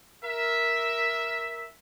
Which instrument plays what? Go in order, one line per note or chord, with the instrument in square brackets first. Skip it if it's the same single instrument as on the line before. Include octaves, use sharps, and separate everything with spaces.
[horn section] A#4 E5